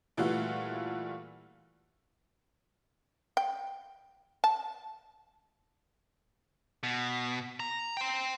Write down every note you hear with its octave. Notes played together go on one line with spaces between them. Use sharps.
A#2 E3 G3 A3 F4 F#4
G5
A5
B2
A#5
G5 C6